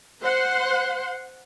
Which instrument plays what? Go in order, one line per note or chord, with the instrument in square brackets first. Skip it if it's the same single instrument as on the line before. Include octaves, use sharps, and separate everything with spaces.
[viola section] C5 F#5 C6